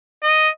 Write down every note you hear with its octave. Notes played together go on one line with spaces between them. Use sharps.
D#5